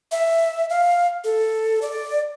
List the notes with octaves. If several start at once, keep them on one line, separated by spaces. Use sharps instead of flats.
E5
F5
A4
D5